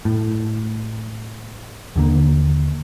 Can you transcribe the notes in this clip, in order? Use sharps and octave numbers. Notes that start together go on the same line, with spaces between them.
A2
D#2 D3 A#3